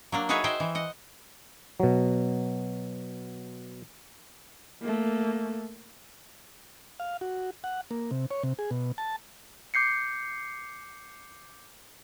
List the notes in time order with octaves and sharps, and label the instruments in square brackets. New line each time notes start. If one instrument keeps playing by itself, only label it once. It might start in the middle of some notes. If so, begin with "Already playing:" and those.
[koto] F#3 A#3 D4
D#4 F#4 G#4 B4 C#5 E5
C5 D#5 E5 G5
E3
D#5 F#5
[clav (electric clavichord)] B2 F#3
[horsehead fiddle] A3 A#3
[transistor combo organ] F5
F#4
F#5
A#3
C3
C#5
C3
G#4
B2
A5
[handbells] D6 G6 C7 C#7